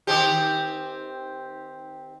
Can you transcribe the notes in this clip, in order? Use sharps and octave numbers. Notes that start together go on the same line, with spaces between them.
D#3 C4 G4